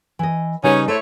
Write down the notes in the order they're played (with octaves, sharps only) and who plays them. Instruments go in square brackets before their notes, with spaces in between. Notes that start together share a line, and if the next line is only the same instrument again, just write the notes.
[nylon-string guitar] E3 D#5
[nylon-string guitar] C#3 G3 B4 [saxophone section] C#4 D#4
[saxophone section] A3 E4 C#5 [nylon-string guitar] C5